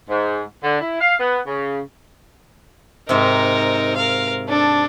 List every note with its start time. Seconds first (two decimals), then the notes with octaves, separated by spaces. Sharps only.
0.09 G#2
0.63 D3
0.81 E4
1.00 F5
1.19 B3
1.46 C#3
3.09 G#2 C3 D#4 A#4
3.96 A#4 F5
4.48 D4 A4